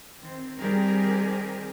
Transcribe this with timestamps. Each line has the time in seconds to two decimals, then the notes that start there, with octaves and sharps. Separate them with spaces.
0.21 D#3 C4
0.61 D#3 G3 C4 G4 G#4 A#4